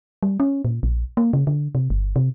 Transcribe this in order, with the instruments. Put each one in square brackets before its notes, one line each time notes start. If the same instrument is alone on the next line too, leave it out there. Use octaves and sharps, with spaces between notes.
[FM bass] G3
C#4
A#2
A#1
A#3
C#3
D3
C3
G1
C3